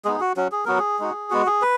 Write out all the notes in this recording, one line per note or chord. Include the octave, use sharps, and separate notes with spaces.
G#3 B3 D#4 G#4
F#4
F#3 C#4 F#4
G#4
F#3 B3 F#4 A#4
G#4
G#3 D#4 F#4
G#3 B3 F#4
G#4
B4